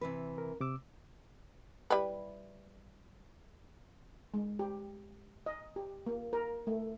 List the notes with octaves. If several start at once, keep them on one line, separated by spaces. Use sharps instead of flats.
C3 E3 B4
A#4
C3 D6 E6
G3 E4 B4
G#3
G4
D#5
G4
A#3
A#4
A3